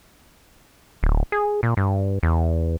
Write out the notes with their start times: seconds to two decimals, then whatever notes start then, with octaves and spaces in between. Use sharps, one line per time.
1.03 D1
1.32 G#4
1.63 A#2
1.77 G2
2.23 E2